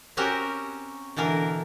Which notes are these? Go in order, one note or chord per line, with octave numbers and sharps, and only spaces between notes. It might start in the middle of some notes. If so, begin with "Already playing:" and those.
C4 C#4 F#4 G4 A#4
B2 D3 E3 A#4